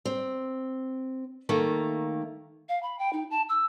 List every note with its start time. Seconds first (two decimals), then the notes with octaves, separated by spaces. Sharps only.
0.05 C4
1.49 D#3 A3 A#3
2.69 F5
2.83 B5
2.99 G5
3.13 D#4
3.31 A5
3.49 E6